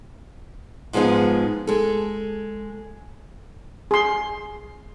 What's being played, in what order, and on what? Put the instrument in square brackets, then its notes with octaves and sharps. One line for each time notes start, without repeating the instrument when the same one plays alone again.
[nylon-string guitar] G#2 F3 G#3 B3 D#4
G#3 A4
[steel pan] G#4 C6